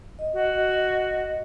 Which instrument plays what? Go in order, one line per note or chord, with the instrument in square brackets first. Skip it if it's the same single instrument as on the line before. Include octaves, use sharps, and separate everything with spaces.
[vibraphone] D#5
[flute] F#4